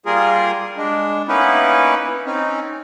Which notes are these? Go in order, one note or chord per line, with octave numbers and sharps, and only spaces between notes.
G3 A#3 F4 G#4 A#4
G#3 D4
A#3 B3 C#4 D#4 E4 B4
C4 C#4 D#4